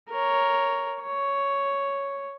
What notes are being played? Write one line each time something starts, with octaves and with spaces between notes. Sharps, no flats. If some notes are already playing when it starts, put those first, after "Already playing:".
A#4 C#5
C#5